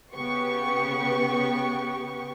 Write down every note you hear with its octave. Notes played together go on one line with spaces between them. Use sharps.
C#3 B3 G4 C#6